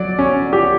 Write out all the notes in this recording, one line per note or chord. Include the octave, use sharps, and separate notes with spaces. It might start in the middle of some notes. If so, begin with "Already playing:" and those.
Already playing: F#3 D5
C#4
G4